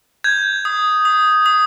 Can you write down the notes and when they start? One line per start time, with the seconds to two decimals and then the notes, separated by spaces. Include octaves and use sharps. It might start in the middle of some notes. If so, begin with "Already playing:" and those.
0.24 G6 G#6
0.65 D#6
1.05 D#6
1.46 D#6